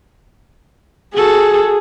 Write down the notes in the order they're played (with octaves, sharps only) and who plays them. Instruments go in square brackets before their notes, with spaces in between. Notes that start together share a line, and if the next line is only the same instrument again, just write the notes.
[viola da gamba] F#4 A4 [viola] G#4